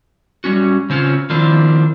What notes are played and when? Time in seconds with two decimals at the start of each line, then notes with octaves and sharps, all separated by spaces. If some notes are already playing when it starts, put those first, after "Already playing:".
0.44 G3 G#3 C#4 F#4
0.90 C#3 C4 C#4 F4
1.30 D#3 F3 A#3 C4 D4 E4